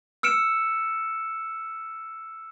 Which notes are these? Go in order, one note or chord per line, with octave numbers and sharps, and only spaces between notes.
E6 F6 C#7 D7 E7